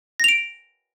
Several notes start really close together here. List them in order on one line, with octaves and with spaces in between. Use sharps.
A#6 F7 D7